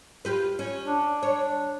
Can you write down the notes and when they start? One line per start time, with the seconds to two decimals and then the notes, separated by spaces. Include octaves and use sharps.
0.25 F4 G4 B4
0.59 C#4
0.84 D4
1.23 C#5